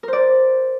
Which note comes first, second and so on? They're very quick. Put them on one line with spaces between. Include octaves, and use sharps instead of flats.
A#4 C5 D5